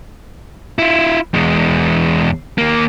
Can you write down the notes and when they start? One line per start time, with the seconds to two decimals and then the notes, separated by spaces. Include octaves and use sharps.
0.79 E4 F4
1.34 E2 G#3
2.58 D#2 A#3